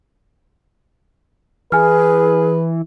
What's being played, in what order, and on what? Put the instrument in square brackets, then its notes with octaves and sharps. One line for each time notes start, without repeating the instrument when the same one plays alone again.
[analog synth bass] E3 [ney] G#4 [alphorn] B4 [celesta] G#5 F6